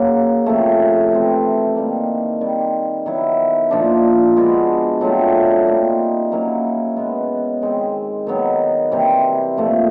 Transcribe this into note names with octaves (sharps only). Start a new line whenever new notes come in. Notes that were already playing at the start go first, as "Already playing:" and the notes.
Already playing: C#3 F#3 A#3
C3 F3 A3 C#4
E3 A3 C4
D#3 G3 A#3
D#3 G3 C4
D#3 F#3 B3 E4
A#2 F3 A#3 D4
G#3 B3 D4 F#4
F#3 A3 C4 F4
G3 A#3 D#4
F#3 A#3 C#4 E4
B2 G#3 B3
D#3 G#3 C4
D#3 F#3 B3 D#4
C3 E3 G3 C4
A#2 F3 A3